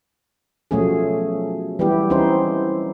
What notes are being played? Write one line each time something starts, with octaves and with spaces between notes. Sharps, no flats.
B2 F3 F#3 A3 C#4 G#4
E3 G3 B3 E4 G4
E3 C4 C#4 D#4 C5